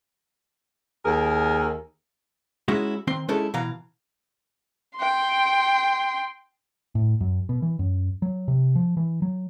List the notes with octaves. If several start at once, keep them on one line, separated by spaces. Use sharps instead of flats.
D#2 G#4 A#4
G#3 C#4 D#4 E4 F#4
D#3 C4 C6
G#3 C#4 D#4 E4 A4
B2 E3 F5 A#5
G5 C6
A2
F#2
B2
E3
F#2
F#3
C3
F3
E3
F#3